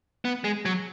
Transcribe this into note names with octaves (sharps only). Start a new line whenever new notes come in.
B3
G#3
F#3